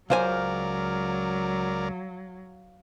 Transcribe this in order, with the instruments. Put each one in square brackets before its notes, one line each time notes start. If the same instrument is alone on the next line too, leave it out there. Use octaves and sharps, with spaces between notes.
[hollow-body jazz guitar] C#2 C5 G#5 [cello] F#3 [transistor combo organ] A#4 D5 [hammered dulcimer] F5